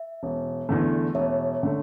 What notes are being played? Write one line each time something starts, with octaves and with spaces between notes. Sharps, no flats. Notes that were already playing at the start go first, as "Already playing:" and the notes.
Already playing: E5
E1
E2 D3 A3
E1 C#5 E5
D3 A3